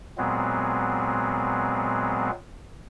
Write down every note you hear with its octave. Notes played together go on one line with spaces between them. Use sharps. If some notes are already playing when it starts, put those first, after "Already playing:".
A#2 F#3 G#3 B3 C4